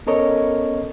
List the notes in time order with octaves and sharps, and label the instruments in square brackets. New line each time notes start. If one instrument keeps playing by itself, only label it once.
[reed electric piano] B3 C#4 A4 A#4 C#5 D#5